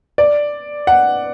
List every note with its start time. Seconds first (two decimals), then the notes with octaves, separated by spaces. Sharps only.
0.18 D5
0.87 F#5